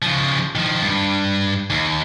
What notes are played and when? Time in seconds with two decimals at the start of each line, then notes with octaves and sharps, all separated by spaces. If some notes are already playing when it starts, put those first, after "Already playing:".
0.02 C#3 F3
0.55 D#3 F3
0.83 G2
1.70 D#2